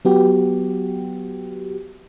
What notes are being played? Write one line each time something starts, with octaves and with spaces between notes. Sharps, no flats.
F#3 B3 F#4 G4